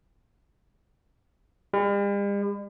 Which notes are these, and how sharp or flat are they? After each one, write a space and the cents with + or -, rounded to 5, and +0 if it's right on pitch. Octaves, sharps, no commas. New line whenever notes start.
G3 +45